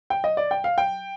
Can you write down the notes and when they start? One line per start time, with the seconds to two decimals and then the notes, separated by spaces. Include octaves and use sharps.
0.10 G5
0.24 D#5
0.37 D5
0.51 G5
0.64 F5
0.78 G5